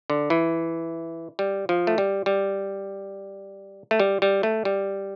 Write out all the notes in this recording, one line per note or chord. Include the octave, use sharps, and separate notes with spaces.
D3
E3
G3
F3
A3
G3
G3
A3
G3
G3
A3
G3